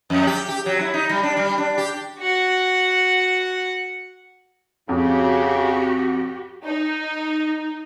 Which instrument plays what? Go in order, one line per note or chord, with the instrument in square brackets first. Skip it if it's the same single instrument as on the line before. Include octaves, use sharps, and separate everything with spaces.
[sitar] F2
G4
G4
F#3
E4
D#4
G3
D4
G3
D4
G4
[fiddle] F#4 F#5
[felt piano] F2 [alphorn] C#3 [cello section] F#4 G4
[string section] D#4